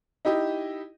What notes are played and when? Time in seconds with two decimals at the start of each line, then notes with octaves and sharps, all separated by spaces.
0.25 D#4 E4 G4 D#5